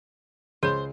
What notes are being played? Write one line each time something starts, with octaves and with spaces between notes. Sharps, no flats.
C#2 G#4 C5 C#5 B5